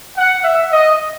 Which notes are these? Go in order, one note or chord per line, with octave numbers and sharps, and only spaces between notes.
F#5
E5
D#5